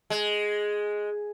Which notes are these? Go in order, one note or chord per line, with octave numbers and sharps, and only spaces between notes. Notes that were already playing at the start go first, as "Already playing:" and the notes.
G#3